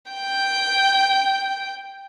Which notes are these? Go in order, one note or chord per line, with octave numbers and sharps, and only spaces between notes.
G5 G6